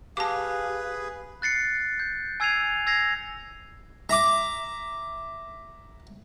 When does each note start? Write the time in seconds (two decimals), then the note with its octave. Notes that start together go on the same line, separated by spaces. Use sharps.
0.17 G4 G#4 B4 F5 A5 D6
1.42 F#6 A6 C7 C#7
2.00 G6
2.40 G#5 E6 G#6 C7 D#7 F7
2.87 E6 G#6 A#6 C7 F7
4.09 E5 A#5 D6